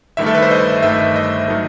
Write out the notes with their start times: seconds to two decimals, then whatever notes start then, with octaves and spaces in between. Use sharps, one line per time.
0.17 G1 G2 D#3 A3 E5
0.26 A4
0.35 B4
0.42 C5
0.51 D#5
0.83 G1 G2 D#3 A3 E5
1.16 D#5
1.48 D#3 F#3 A3